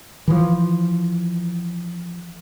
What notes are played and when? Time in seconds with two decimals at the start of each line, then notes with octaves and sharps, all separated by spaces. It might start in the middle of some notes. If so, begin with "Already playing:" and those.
0.28 E3 F3